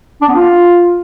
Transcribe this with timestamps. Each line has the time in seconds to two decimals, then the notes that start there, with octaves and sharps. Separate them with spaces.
0.22 D4
0.28 B3
0.35 F4